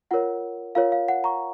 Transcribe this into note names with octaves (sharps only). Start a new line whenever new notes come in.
F4 A#4 C#5 F#5
F4 A#4 C#5 F5
F5
F#5
A#5 C#6